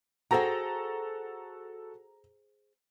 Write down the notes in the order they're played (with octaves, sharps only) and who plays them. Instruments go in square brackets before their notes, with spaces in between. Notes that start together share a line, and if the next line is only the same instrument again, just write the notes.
[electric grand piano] F#4 A4 F#5 [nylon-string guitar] G#4 C5 G5 [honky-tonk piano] A#5 A#6